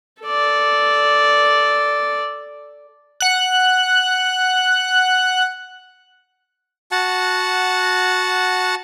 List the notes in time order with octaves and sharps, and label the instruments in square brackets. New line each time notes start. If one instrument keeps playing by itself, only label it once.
[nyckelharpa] A4 D5
[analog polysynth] F#5 F#6
[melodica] F#4 F#5 A5